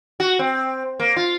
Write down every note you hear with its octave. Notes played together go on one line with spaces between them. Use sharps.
F#4
C4
A#3
F4